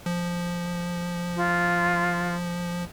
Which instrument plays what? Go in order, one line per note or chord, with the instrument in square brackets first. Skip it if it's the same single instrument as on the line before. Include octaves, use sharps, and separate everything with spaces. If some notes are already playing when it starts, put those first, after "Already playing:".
[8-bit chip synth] F3
[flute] F4